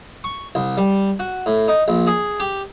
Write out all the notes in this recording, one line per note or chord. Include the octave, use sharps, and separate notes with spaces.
C#6
C2
G3
F#4
A2
D#4
A#1
G#4
G4